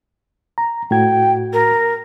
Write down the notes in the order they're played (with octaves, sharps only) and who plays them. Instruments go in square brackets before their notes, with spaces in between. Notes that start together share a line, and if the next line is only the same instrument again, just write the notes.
[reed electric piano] A#5
[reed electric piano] A2 F#4 G#6 [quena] G5
[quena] A#4